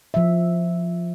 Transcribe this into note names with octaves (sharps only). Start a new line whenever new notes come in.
F3 E5